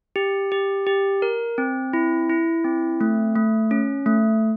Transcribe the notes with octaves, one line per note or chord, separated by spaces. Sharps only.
G4
G4
G4
A#4
C4
E4
E4
C4
A3
A3
C#4
A3